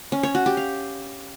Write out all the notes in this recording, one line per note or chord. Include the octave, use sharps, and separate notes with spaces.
C#4
C#5
F#4
G4
F5